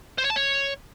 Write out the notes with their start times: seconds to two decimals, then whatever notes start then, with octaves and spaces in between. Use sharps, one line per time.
0.18 C5
0.24 C#5
0.30 A5
0.36 C#5